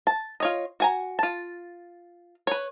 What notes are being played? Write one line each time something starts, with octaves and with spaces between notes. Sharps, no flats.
A5
F4 C#5 D#5
F#4 G#5 A#5
F4 A5
B4 C#5